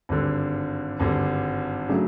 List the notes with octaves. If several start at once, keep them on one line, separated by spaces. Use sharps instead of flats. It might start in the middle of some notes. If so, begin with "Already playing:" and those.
G#1 G2 D3
G#1 G2 D3
C#3 F#3 A3 D4